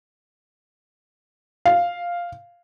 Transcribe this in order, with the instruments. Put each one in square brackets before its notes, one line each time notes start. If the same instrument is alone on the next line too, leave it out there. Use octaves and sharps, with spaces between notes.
[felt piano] F5